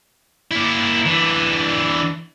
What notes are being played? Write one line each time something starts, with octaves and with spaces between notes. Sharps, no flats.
A#3 E4
E3 D4